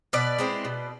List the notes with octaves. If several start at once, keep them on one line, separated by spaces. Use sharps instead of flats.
B2 B4 D5
G#3 C4 E4
B2